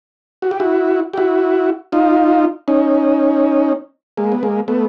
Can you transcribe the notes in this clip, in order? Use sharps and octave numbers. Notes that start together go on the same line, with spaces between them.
F#4
G4
E4 F#4
G4
E4 F#4
D#4 F4
C#4 D#4
G#3 A#3
B3
G#3 A#3
A3 B3